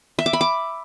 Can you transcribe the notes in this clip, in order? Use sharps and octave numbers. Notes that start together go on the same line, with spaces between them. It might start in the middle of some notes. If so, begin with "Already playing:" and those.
E5
D6
B5
D6